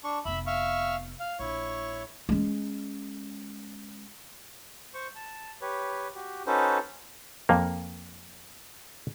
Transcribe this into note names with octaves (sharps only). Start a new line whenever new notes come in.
D4 C#6
F1 B3 E5 B5
E5 F5 C#6
F5
A#1 E4 C#5 C#6
G#3 C#4
C5 C#6
A5
G4 B4 C#5
F#4 G4
C#4 D#4 F#4 A4 B4 C5
F2 A#3